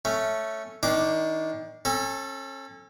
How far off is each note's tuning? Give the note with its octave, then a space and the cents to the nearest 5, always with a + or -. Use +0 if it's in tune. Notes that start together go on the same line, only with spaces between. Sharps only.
A3 +0 C#4 +0
D#3 +30 D4 +15 D6 +0
C#4 -35 A4 +0